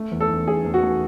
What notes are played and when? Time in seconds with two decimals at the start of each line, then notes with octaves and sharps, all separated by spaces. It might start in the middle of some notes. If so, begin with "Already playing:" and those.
Already playing: A3
0.12 E2
0.20 A4
0.29 E2
0.48 A3 G#4
0.65 E2
0.74 F#4
0.83 A3